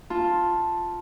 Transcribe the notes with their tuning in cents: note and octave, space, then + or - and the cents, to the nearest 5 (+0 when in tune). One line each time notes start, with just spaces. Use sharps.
F4 +0 A5 +0